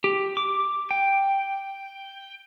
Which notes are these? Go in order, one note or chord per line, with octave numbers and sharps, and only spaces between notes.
G4
D6
G5